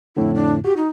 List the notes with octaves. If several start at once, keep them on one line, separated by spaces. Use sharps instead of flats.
F2 A2 D3 E4
D4
F#4 G4
D#4